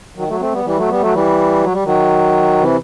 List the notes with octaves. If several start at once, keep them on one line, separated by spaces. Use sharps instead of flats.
D#3 F#3
F#3 A3
A3 C4
G3 B3
E3 G3
F#3 A3
G3 B3
F#3 A3
E3 G3
F#3
G3
D#3 F#3
C3 E3